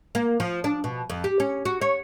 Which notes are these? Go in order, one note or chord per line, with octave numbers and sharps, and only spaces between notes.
A#3
F3
D4
B2
F2
G4
C#4
F#4
C#5